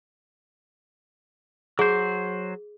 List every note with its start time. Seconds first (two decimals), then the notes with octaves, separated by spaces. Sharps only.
1.79 F#3 G#4 C5